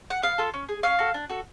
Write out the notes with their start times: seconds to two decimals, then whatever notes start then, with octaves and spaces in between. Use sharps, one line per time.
0.10 F#5
0.22 B3 F5
0.38 F4 A4
0.54 C#4
0.69 G#4
0.83 C#4 F5
0.99 F#4 A4
1.14 D4
1.30 F#4 A4